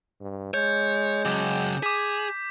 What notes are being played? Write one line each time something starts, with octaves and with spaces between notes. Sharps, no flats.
G2
G#3 C#5 G6
C#3 F#3 D6
G#4 D6 B6